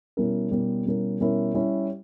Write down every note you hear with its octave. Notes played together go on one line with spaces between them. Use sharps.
B2 G3 C#4 E4 A#4
B2 G3 C#4 E4 A#4
B2 G3 C#4 E4 A#4
B2 G3 C#4 E4 A#4
G3 C#4 E4